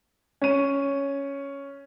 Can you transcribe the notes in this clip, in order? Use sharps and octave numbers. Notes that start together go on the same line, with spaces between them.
C#4 D#7